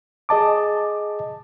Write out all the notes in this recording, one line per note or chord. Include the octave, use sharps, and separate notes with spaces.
G#4 D#5 A5 D6